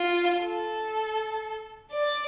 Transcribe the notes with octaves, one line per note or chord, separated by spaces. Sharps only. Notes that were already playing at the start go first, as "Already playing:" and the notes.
Already playing: F4
A4
D5